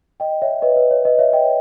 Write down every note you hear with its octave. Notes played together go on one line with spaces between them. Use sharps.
D#5 G5
C#5 E5
B4 D#5
B4
C#5
B4 D#5
C#5 E5
D#5 G5